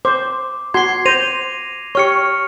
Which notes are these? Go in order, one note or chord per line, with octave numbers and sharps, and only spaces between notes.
C5 D6
F#4 C6 G#6 C7
C5 A#6 D#7 F7
G4 C#5 C#6 F6 C#7